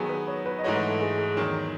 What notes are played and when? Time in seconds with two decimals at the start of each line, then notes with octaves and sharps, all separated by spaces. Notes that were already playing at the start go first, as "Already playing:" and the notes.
Already playing: D#3 F#3 B3 G#4
0.09 B4
0.27 C#5
0.46 B4
0.59 D#5
0.64 G#2 E3 A3 D#4 F#4 C#5
0.76 B4
0.88 A4
1.00 G#4
1.18 G#4
1.36 E2 D#3 F#3